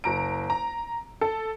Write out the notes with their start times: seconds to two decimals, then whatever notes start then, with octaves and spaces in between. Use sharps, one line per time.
0.04 F#1 A#5 D7
0.50 A#5
1.21 A4